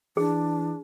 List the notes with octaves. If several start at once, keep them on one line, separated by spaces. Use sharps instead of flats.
E3 D4 G#4